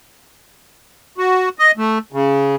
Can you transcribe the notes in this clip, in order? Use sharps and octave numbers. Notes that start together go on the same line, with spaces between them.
F#4
D#5
A3
C#3